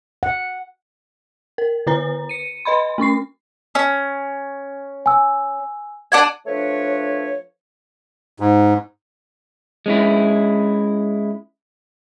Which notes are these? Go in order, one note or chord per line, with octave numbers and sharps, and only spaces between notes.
F#5
A#4
D3 E4 B4 A#5
C#7 D#7
B4 D#5 B5 C6
A3 C#4 C#6 C7
C#4
G#5 E6
D4 F#5 G#5
F3 A3 D4 B4 C#5
G#2
G#3 C#4 E4